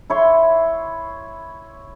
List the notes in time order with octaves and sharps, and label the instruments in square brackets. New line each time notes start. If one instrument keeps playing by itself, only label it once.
[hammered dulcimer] E4 C#5 C6